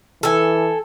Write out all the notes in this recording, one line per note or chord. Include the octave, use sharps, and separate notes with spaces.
E3 A4 G#5